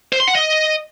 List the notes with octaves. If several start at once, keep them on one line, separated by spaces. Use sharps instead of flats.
C5
C6
F#5
D#5